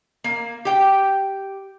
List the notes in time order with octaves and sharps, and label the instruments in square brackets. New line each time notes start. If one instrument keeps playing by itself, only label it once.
[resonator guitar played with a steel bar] A#3
G4 G5